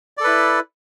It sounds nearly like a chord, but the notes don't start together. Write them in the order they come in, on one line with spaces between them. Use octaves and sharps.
D5 A4 B4 E4